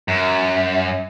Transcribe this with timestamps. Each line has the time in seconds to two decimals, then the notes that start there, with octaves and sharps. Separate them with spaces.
0.08 F#2